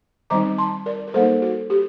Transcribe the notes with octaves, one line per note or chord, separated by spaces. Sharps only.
D#3 G3 C4 D#4 A#5 D6
A5 C6
A#4 D5
A#4
G3 A#3 D#4 A4 C5
F#4 A4
G4